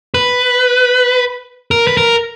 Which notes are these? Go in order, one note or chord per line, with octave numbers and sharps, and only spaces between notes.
B4
A#4
B4
A#4